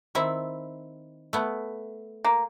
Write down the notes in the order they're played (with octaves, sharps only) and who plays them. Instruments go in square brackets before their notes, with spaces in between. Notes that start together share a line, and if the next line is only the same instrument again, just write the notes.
[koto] D#3 C4 E4
A3 B3
[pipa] A#3